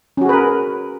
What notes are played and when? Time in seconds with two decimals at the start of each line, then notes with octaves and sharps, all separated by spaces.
0.17 C#4
0.21 F#4
0.25 G#4
0.29 B4
0.33 A#4